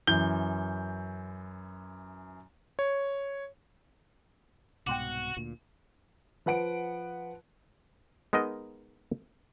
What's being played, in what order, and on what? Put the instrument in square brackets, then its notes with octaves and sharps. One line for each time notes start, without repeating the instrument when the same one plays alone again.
[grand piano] F#2 E3 G6 G7
[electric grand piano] C#5
[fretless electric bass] C2 G#2 B2 [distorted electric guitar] F#4 [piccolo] F#5 [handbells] G5 C6 D6
[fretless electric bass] D2 A#2
[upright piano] F3 B4 F#5 D7
[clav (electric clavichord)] G#3 B3 D#4 A#4 D#5